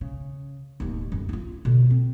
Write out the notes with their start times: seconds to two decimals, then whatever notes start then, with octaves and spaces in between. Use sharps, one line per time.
0.01 C#3
0.80 D1 D#2
1.12 F#2 D3
1.29 D#4 F4
1.65 B2 D3
1.90 C4